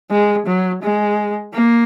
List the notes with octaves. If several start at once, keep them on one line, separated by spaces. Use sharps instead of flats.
G#3
F#3
G#3
A#3